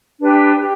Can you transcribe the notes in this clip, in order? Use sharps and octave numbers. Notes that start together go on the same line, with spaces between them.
D4 G4 B4
G4